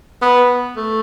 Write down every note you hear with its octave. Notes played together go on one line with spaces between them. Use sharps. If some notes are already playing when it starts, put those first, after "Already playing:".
B3
A3